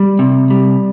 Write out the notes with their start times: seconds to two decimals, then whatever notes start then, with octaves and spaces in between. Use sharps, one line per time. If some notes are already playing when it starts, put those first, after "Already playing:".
Already playing: G3
0.19 C3
0.50 G3